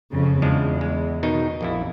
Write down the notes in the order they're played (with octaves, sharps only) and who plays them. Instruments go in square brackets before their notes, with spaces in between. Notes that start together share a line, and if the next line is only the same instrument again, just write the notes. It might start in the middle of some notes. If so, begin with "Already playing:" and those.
[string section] F2 C#3
[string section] E2 [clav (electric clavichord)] F3 G#3 D4
[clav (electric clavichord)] G#3
B2 D#3 D#4
A#1 F2 E4